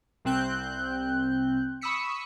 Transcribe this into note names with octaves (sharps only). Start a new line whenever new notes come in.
C2 C4 F#6 G6
B5 C#6 D#6 E6 B6 C#7